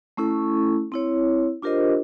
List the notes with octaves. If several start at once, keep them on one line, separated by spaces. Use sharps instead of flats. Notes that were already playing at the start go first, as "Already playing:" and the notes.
A3 C#4 E4 A4 C#6
C4 E4 C#5
D4 F4 G4 A#4 C5 D#5